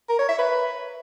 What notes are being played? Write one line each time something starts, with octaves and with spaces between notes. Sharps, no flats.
A#4
C#5
E5
B4